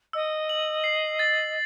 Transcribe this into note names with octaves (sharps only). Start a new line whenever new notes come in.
D#5 E6
F#7
C7
A6